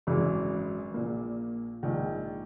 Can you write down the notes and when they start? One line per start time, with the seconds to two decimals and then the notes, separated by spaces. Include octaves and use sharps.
0.07 G#1 F#2 E3 G#3
0.94 A#1 A#2 A#3
1.83 A#1 G#2 D#3